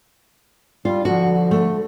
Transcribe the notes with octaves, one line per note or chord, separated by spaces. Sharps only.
G3 F4
D3 F3 F#4
A3